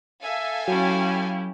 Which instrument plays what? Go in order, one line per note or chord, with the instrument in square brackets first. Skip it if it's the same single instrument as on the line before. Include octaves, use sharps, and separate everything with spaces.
[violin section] A4 F5 G#5 [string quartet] E5
[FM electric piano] F#3 [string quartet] C#4 E4 G4